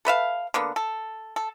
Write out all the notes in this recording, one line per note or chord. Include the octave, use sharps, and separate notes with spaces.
A4 B4 E5 F5
D3 A#3 B3
A4
A4